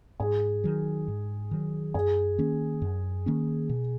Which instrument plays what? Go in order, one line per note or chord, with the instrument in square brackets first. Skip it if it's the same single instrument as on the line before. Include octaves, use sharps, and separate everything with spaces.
[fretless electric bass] G#2 [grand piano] G#4
[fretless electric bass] D#3 F#3
G#2
D#3 F#3
[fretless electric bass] F#2 [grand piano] G#4
[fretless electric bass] D#3 A#3 C#4
F#2
D#3 A#3 C#4
B2